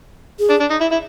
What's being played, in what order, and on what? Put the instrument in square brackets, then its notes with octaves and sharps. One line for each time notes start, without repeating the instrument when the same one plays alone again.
[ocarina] G#4
[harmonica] D4
D4
D#4
E4
E4